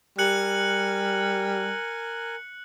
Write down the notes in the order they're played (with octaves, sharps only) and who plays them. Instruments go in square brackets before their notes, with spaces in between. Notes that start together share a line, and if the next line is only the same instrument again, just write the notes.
[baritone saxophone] G3 [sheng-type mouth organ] A#4 G#5 [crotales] F#6 C#7 F#7